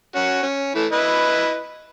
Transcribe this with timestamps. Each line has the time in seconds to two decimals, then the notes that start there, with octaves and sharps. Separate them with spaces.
0.15 C#4 F#4
0.43 C#4
0.75 E3 A3
0.92 E4 B4 D#5